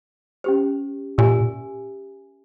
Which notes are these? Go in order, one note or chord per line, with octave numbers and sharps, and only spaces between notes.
C#4 G4 C5
A#2 G4 A#4 E5 G#5